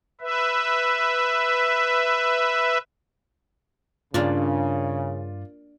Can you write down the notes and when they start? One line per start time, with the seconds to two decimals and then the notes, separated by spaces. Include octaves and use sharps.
0.21 B4 E5
4.14 G2 C#3 A#3 D4 F4 D5